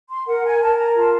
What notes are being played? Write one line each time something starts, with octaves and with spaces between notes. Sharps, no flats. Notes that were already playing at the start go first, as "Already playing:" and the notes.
C6
A#4 F#5
G#5
A#4 A5
A#5
F4 A5